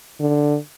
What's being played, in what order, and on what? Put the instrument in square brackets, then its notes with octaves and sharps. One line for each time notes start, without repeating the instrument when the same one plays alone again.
[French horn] D3